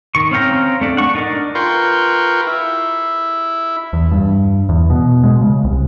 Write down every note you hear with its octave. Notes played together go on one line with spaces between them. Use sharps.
D#3 C#6
C4 C#4 F5 G5 A#5
A3 D4
F#5 C#6
D4 D#4 A#4 D5
F4 A#4 B4 G5 C6 C#6
E4
E2
G2
E2
B2
G#3
C#3
C2